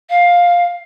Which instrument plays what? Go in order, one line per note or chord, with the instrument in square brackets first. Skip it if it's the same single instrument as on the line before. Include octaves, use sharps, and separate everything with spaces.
[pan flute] F5